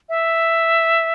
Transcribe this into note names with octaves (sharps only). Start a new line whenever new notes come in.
E5